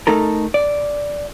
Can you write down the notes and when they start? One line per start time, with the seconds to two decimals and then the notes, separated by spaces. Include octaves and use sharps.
0.07 A3 D#4 A4 A#4
0.54 D5